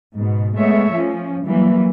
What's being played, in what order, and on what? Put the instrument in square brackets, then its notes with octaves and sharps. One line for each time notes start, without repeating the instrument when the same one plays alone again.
[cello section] G#2 B2
G#3 A3 B3 C#5 E5
F3 C#4
E3 F#3 G3 A#3